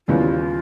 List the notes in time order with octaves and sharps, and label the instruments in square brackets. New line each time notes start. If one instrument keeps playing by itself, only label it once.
[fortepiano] D#2 C#3 E3 G3 B3 [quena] F4